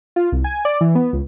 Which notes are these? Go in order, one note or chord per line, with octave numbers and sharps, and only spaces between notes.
F4
C2
G#5
D5
E3
B3
C#2